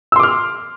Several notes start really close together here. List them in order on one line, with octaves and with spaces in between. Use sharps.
E6 C6 D6 F6